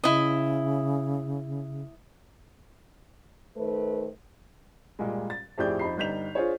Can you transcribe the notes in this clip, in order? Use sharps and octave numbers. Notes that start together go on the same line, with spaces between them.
C#3 E4 D#5
D#3 A3 B4 C5
A#2 G3 G#3
A6
F2 A2 G4 G#4 D5 G6
F2 D#4 B5 C7
G1 G3 D#4 G6 B6 F7
D4 F4 G#4 C5 C#5